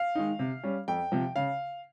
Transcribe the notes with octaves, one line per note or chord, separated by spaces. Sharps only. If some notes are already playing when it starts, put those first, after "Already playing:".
Already playing: F5
D#3 G#3 D#4
C3
G3 C#4
F2 G5
C3 F3
C#3 F5